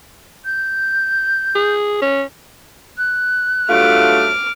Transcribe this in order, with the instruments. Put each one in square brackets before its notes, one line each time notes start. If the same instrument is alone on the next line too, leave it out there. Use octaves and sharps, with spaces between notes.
[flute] G6
[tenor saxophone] G#4
C#4
[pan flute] F#6
[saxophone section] G2 F#3 A3 [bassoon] F4 [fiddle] D6 F6